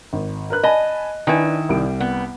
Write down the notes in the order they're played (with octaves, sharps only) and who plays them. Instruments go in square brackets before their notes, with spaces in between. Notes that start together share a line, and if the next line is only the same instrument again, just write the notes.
[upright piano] G#1
A#4 B4 F#6
[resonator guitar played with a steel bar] D#5 [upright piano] G#5 A5 B5
[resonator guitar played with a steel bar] D#3 E4 [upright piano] D4 B4 G#5
[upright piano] C2 G3 D7
[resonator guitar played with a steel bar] B3